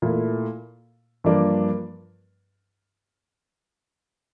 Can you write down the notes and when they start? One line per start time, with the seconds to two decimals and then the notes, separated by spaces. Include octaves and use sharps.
0.02 A#2 A3 E4 A#4
1.24 G2 F3 A#3 D4